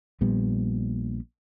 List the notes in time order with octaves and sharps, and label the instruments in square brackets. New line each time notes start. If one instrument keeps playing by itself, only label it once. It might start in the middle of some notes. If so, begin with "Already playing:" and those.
[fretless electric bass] A#1 A#2 G3 B3